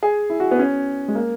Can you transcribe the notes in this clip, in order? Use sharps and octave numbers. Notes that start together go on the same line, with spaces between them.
G#4
E4
F#4
B3
C#4
G#3
A#3